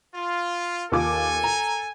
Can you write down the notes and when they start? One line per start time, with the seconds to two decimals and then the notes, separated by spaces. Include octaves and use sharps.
0.15 F4
0.92 D#2 F4 A4 G#5 D6
1.44 A#5